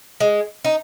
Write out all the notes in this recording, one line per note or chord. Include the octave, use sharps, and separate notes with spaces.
G#3
D#4